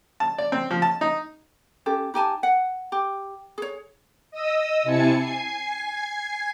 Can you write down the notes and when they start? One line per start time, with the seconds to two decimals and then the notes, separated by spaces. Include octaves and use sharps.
0.20 A5
0.38 D5
0.52 C4
0.71 F3
0.82 A5
1.01 D#4
1.86 C#4 G4 A4
2.14 D#4 G4 G#5 A5
2.43 F#5
2.92 G4
3.58 G#4 C#5
4.31 D#5 D#6 E6
4.83 C3 C4 E4 G#5 A5 C#7
5.17 G#5 G#6 C7